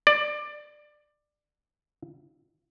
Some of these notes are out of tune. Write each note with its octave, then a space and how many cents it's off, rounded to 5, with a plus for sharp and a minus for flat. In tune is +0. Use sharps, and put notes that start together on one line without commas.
D5 +20